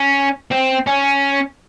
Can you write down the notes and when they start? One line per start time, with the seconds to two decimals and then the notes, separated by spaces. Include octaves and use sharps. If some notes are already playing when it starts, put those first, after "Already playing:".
Already playing: C#4
0.51 C4
0.87 C#4